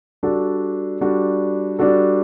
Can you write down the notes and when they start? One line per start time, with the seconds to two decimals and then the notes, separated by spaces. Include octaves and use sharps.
0.23 G3 D4 F#4 A4
1.00 G3 D4 F#4 A4
1.79 G3 D4 F#4 A4